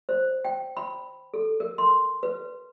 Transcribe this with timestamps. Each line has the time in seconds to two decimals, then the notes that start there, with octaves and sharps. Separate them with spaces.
0.09 C5
0.45 G5
0.77 B5
1.34 A4
1.60 A#4
1.78 C6
2.23 B4